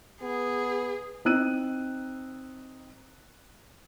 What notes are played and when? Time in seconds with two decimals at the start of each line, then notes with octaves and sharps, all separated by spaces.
0.22 B3 G#4
1.25 C4 D#4 E6 F#6 D#7